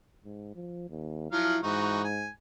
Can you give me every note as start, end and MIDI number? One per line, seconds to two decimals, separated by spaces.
0.25 0.53 44
0.55 0.88 53
0.90 1.28 39
1.32 1.58 53
1.32 1.58 54
1.32 1.63 64
1.32 1.58 77
1.63 2.30 44
1.63 2.03 52
1.63 2.03 63
1.63 2.03 66
2.04 2.28 80